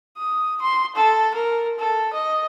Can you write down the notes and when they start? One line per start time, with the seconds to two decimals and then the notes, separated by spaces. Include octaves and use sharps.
0.18 D#6
0.62 C6
0.96 A4
1.34 A#4
1.79 A4
2.13 D#5